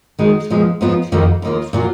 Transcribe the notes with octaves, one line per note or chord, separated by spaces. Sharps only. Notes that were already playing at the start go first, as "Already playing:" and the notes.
D#3 G#3 D#4 F#4
A#2 F3 G#3 B3
G#2 F3 B3 F4
F2 D#3 A#3 D#4 F#4
D#2 D#3 A#3 F4
A#2 F#3 A#3 F4